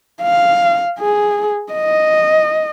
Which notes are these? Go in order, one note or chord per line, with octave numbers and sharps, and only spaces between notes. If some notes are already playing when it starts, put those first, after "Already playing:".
F5
G#4
D#5